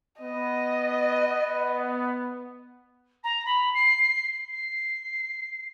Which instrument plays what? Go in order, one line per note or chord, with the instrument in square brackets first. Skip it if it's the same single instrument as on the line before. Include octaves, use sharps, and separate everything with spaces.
[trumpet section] B3 [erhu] D#5
[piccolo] A#5
B5
C7
C7